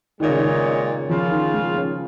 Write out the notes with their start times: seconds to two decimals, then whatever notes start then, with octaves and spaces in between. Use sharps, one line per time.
0.20 A#2 D#3 G#3 D#4 C#5
0.29 C#3
0.39 D#3
1.09 C#3 F3 A#3 F4
1.31 D#3
1.54 G#3
1.76 C#4